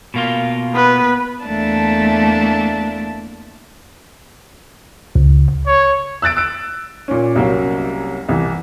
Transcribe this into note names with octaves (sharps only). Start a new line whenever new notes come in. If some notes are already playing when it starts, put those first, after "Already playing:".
B2 A#3 F4
B3 B4
E2 A3 A#3 D4 A5
C#2
C#5
E6 F#6 A6 D7
E6 D7
A#2 C#4
C2 F#3 A#3 C#4
C2 E3